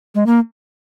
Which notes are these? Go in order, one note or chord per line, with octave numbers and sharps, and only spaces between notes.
G#3
A#3